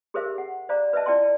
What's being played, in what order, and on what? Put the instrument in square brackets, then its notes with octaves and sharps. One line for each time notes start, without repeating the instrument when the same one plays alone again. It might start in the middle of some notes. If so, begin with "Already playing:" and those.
[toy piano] G4 G#4 A#4 C5 E5 F5
F#5
C5 D5 F5 A#5 D6
B4 C5 D#5 E5 A5
E4 D5 G5 A5 C6